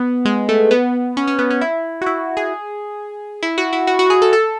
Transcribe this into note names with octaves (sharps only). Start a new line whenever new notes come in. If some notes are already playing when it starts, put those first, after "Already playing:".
Already playing: B3
G#3
A3
B3
C#4
C#4
B3
C#4
E4
F#4
E4
G#4
E4
F#4
E4
F#4
F#4
G#4
A4
A4